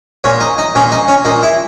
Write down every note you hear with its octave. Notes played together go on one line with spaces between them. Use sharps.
A#2 C#4
D#4
D#4
A#2 C#4
D#4
C#4
A#2 D#4
E4